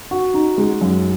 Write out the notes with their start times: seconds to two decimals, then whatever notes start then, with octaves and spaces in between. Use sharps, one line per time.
0.11 F#4
0.34 D#4
0.58 G#3
0.81 F#2